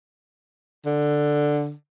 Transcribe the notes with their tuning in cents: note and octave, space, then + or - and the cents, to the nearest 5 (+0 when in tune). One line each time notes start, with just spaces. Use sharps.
D3 +5